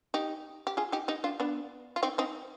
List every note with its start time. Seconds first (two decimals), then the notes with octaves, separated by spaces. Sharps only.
0.14 D#4 G4
0.67 G4
0.77 F4 G#4
0.92 D#4 G4
1.08 D#4 G4
1.24 D4 F4
1.40 B3 D4
1.96 F4
2.03 C4 D#4
2.18 C4 D#4